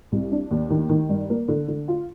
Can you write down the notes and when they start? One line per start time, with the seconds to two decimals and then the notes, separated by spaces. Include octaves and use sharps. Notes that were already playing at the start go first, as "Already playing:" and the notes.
0.12 C2
0.32 D4
0.51 D#2
0.70 D#3
0.90 D#3
1.09 G2
1.30 A#3
1.48 D3
1.68 D3
1.88 F4